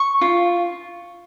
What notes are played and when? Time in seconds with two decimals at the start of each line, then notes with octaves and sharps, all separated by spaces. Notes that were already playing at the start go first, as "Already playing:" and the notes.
Already playing: C#6
0.21 F4